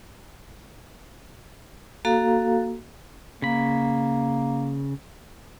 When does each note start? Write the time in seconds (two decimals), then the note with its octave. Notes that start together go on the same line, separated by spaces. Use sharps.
2.05 A#3 F#4 A4 F5 A#5
3.42 C#3 A#3 B5